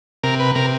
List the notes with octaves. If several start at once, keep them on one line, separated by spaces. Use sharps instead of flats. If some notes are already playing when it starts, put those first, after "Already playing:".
C3 A#4
B4
C3 A#4